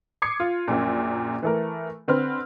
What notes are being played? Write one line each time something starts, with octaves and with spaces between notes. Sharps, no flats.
D6 D#6 G#6 C7 C#7
F4
A#1 F#2 A#2
E3 A3 A#4
D3 C4 B4 F6